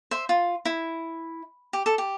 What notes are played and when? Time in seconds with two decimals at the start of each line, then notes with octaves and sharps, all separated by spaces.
0.11 C5 E5
0.29 F4
0.65 E4
1.73 G4
1.86 A4
1.98 G4